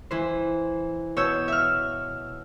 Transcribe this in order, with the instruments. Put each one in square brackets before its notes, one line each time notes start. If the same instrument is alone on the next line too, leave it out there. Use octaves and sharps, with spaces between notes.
[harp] E3 C5
B2 C#5 E6 G6
E5 F6